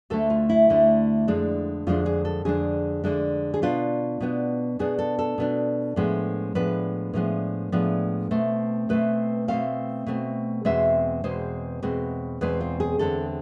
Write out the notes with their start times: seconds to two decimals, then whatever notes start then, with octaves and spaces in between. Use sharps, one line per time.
0.10 D2 D3 A3 A4
0.30 F4
0.49 E4
0.69 D2 D3 A3
1.28 F2 D3 G#3 D4
1.87 F2 D3 G#3 D4 F4
2.06 G#4
2.25 A4
2.45 F2 D3 G#3 D4 G#4
3.04 F2 D3 G#3 D4
3.54 G#4
3.62 B2 B3 D4 F4
4.20 B2 B3 D4
4.79 B2 B3 D4 G#4
4.99 A4
5.19 A4
5.38 B2 B3 D4
5.96 A2 F3 G#3 B3 D4
6.55 A2 F3 G#3 B3 D4 B4
7.13 A2 F3 G#3 B3 D4
7.72 A2 F3 G#3 B3 D4
8.31 B2 A3 C4
8.89 B2 A3 C4 B4
9.48 B2 A3 C4 F5
10.07 B2 A3 C4
10.65 E2 B2 G#3 C4 E5
11.24 E2 B2 G#3 C4 C5
11.83 E2 B2 G#3 C4
12.41 E2 B2 G#3 C4 B4
12.61 F4
12.80 G#4
12.99 E2 D3 G#3 C4 A4